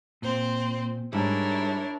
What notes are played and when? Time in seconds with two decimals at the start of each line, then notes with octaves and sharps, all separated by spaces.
0.22 A#2 C4 C5
1.13 G#2 G3 D4 E4 A#4 C#5